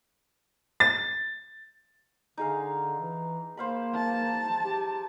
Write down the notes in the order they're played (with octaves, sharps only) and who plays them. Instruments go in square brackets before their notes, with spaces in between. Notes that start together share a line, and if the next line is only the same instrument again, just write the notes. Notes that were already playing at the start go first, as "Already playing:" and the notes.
[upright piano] A6
[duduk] D3 [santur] D#4 G#4 F5
[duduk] E3
[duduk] A#3 [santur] C5 F5 B5
[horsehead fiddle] A5
[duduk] G4